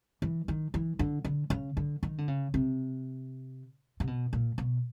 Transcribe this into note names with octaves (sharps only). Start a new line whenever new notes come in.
E3
D#3
E3
D3
D3
C#3
D3
D#3
D3
C#3
C3
C3
B2
A#2
B2